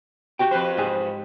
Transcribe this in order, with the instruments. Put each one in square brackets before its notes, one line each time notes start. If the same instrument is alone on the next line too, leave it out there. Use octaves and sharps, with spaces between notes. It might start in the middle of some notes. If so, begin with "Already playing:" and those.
[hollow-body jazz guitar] F#4 G4 G5
[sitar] F2 B4 C5
[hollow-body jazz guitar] G#2 G4 G#4